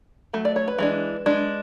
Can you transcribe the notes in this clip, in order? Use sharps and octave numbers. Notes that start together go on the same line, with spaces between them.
F#3 A3
D5
C#5
B4
E3 G#3 D4
G#3 D4